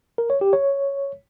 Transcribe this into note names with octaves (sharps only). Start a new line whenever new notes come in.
A#4
C#5
G4
C#5